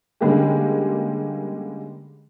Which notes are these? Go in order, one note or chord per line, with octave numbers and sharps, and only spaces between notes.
D3 G3 G#3 A#3 C#4 G4